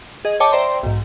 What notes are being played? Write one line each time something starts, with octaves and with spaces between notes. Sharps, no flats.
G#4 D#5
C#5 D#5 G5 A5 D6
C5 D5 E5 G5 A#5 C6
B1 G#2